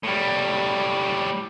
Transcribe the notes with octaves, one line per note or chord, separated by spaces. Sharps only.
A2 G3